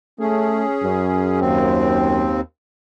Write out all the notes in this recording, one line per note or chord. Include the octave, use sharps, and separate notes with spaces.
A3 C#4 G#4
F#2
D#2 C4